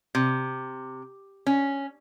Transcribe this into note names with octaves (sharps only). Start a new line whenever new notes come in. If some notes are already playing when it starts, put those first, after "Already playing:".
C3
C#4